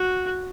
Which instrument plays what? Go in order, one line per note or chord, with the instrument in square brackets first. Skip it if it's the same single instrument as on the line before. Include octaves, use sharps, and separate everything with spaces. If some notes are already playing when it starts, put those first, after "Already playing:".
Already playing: [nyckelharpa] F#4